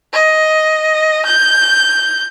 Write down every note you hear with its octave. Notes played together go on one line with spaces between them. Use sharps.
D#5
G6